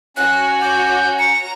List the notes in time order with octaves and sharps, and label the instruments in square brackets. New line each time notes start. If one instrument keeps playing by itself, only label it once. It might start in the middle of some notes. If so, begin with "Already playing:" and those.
[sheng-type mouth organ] C#4 [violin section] F#4 C#5 [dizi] F#6
[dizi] D6 [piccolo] G6
[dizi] A#5 [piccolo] C#7